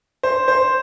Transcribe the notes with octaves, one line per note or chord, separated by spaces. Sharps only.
C5
C5